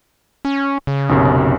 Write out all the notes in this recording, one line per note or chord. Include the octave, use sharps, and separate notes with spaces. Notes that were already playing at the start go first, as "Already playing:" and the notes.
C#4
C#3
B1 F#2 C3